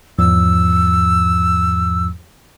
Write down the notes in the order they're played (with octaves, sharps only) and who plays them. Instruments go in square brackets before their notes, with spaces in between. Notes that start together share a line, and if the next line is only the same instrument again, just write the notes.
[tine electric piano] E2 G#2 F3 [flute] E6